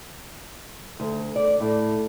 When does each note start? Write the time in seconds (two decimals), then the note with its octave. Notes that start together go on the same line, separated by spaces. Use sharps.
1.00 D2
1.36 D5
1.60 A2